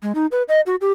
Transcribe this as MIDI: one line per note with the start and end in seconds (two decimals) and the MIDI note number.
0.03 0.12 56
0.15 0.26 63
0.32 0.43 71
0.49 0.61 75
0.66 0.76 66
0.81 0.92 67